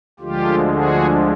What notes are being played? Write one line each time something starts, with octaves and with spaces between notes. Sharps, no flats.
D2 D3 F3 G#3 F4 G4
F#4 G#4